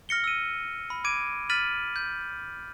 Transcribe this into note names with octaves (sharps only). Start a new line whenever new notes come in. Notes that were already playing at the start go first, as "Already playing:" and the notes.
F6 A#6 C#7 G7
E6 D#7
B5
D6 G#6 D7 D#7
F6 A6 B6 D#7 F#7
G6